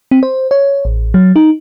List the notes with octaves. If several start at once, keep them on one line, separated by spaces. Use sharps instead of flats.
C4
C5
C#5
A1
F#3
D#4